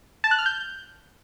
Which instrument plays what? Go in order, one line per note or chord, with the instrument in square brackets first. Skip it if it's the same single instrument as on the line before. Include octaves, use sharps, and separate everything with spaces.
[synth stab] A5
F#6
F6
G6